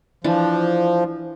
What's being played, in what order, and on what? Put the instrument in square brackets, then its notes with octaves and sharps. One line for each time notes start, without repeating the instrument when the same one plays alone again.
[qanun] E3 D4 [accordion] F3